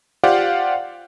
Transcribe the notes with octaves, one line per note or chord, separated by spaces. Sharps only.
F4 G4 C5 D5 F5 F#5